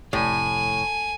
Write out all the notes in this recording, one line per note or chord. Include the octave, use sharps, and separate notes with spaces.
F1 A2 C3 G#5